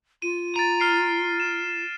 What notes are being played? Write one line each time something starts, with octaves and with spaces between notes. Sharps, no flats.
F4 D#7
A#5 A6 D7 D#7
F6 C7 D7
E7